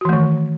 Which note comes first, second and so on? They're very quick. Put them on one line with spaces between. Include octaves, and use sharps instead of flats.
F#4 E3 A3 D#3